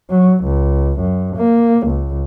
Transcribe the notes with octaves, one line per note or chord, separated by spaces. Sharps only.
F#3
C#2
F#2
A#3
C#2